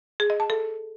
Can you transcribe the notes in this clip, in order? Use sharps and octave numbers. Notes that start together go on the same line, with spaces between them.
G#4
D#5
A5
A4